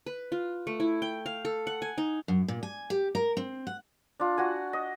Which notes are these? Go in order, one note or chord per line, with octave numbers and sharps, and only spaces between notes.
B4
F4
A3
E4
G5
F5
A4
F#5
G#5
D#4
F#2
A#2
G#5
G4
A#4
C4
F#5
D4 F4
F#4 F#5 G#5
D#5